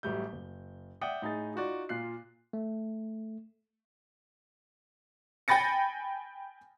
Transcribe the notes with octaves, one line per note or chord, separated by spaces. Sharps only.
A1 F#3 G3 A3 G6
F#1
D5 E5 F#5 G5 D#6
A2 D#4 G#4 A6
D#4 F4 F#4 D5
A#2 F4 F#6 C7
A3
G5 G#5 B5 A6 A#6 C#7